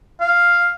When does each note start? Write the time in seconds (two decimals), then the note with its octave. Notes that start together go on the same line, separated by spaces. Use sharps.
0.20 F5